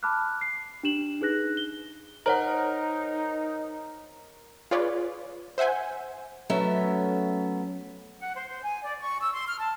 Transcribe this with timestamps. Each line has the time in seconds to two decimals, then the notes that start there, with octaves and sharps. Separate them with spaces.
0.03 A5 B5 D6 F6 F#6
0.41 C7
0.83 D4 G4 E7 F#7
1.21 D#4 G#4 B4 F#6 A#6
1.57 G7
2.26 D#4 A#4 C5 C#5 F#5
4.71 F4 G#4 B4 C#5 D5
5.58 C5 E5 F#5 G#5 G6
6.50 F#3 A3 B3 C#4 A4 E5
8.20 F#5
8.36 C5
8.48 C5
8.63 G#5
8.83 D5
8.99 C#6
9.22 E6
9.34 C6
9.47 F6
9.59 A5